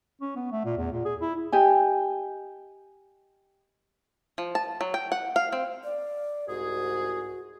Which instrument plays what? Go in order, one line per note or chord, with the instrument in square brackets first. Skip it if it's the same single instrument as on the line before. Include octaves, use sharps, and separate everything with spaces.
[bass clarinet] C#4
B3
A3
A#2
E2
A#2
G#4
E4
[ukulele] G4 D#5 G#5
[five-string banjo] F3
A5
F#3
G5
F#5
F5
C4
[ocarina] D5
[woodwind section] C2 G#2 G#4 [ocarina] F#4